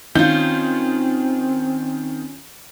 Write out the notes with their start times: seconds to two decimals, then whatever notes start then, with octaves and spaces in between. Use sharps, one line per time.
0.15 D#3 C4 C#4 F4 G6